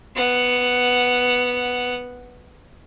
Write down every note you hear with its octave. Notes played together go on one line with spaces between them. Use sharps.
B3 F#5